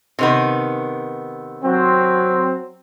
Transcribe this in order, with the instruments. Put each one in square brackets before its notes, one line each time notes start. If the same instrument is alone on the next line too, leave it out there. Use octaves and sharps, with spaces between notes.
[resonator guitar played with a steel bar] C3 D#3 B3
[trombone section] F#3 C4